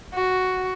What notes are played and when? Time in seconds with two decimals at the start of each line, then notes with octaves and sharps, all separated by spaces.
0.14 F#4